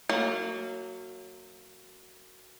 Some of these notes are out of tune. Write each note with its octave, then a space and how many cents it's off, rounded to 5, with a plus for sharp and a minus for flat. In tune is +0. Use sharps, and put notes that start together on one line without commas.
F#3 +0 A#3 -30